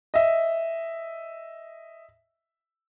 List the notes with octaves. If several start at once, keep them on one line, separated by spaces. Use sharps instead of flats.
D#5 E5